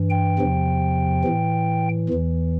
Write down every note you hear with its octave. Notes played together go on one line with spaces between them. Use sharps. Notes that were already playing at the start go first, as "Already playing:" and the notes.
Already playing: G2 E3
G5
E2 C3 F3
A2 E3
E2 E3